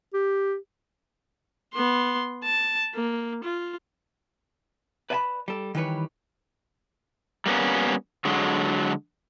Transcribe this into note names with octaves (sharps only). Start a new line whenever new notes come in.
G4
B3 C6
A5
A#3
F4
B4 D5 E5 G#5 A5 B5
G3 A4
D#3 E3 G3 B4 C#5
G3 A#3 B3 C#4
D3 F#3 G#3